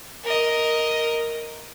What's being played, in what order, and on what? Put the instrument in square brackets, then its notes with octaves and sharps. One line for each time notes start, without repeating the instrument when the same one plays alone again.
[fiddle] A#4 D#5